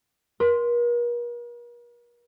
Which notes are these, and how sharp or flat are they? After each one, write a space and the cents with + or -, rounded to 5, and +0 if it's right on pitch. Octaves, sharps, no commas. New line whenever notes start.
A#4 +45 C6 +0